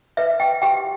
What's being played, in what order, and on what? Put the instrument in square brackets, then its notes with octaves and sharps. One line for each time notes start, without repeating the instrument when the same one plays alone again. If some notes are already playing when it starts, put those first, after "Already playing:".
[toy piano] B4 E5
G5
G4 G5